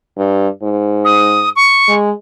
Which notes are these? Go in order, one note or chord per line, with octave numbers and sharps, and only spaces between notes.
G2
G#2
D#6
C#6
G#3